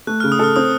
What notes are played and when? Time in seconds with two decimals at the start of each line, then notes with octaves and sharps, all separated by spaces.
0.07 A3 F#6
0.20 C#3 F6
0.32 D#6
0.39 A4 F6
0.56 C4 D#6